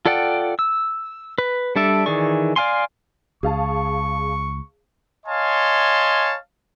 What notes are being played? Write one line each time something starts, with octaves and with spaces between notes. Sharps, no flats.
F4 A4 D5 F#5 G5
E6
B4
G3 D4 A4 D5 E5
D#3 E3 G#4 D5 C#6
D5 F5 G#5 C6
C#2 G#4 F5 A5 C#6
C#5 D#5 F5 G#5 A5 C6